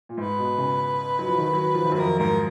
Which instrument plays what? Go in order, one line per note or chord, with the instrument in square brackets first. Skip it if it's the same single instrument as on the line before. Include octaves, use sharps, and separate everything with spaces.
[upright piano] A#2
[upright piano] G#2 [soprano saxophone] B4
[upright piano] B2
C#3
F#3
F3
D#3
F#3
F3
D#3
F#2
[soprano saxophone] B4
[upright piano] F2 [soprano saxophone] A#4
[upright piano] G#2 [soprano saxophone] A#4